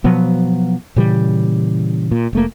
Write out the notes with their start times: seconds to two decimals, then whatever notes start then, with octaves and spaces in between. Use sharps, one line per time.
0.04 B2 F3 F#3 B3
0.96 A#2 C#3 E3 G3
2.11 A#2
2.33 F1 A3 A#3